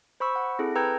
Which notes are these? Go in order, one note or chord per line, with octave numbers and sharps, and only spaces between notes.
C5 B5 C#6 E6
F#5
C4 E4 G#4 A4
B4 G5 A#5 E6 G6 G#6